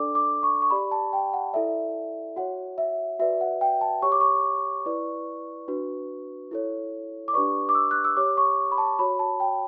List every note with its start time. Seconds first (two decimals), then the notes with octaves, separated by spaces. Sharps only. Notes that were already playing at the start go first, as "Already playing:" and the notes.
Already playing: D4 A4 D5 D6
0.15 D6
0.43 C#6
0.62 C#6
0.70 G4 D5 B5
0.92 A5
1.13 G5
1.33 F#5
1.53 E4 A4 D5 E5
2.36 F#4 C#5 F#5
2.78 E5
3.19 F#4 B4 D5 E5
3.41 F#5
3.61 G5
3.81 A5
4.02 G4 C#5 C#6
4.12 D6
4.21 C#6
4.86 E4 B4 D5
5.68 D4 F#4 B4
6.51 E4 A4 C#5
7.28 D6
7.33 D4 G4 B4 D5 C#6
7.69 D6
7.75 E6
7.91 F#6
8.05 E6
8.17 G4 C#5 D6
8.37 C#6
8.72 B5
8.78 A5
8.99 F#4 C#5 B5
9.19 A5
9.40 G5